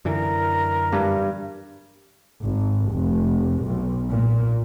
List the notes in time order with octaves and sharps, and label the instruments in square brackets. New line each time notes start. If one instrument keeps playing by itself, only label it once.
[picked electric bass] F#2 D3 E3 [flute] A#4
[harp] G2
[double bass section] G#1
F1
B1
A#2